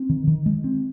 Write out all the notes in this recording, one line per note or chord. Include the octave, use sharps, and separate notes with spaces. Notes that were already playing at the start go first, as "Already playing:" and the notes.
Already playing: C4
D#3
D#3
G#3
C4